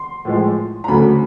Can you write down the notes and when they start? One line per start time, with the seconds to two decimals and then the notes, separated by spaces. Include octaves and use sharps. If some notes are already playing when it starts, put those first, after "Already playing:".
Already playing: C6
0.25 A2 F3 G#3
0.84 A#5
0.88 D2 C#3 F#3 A3 B5